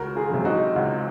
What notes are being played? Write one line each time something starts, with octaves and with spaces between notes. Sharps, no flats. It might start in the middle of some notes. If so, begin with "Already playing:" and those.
Already playing: C#2 F#4 A#4
F4 G#4
C3 F#3
D#4 F#4
C#2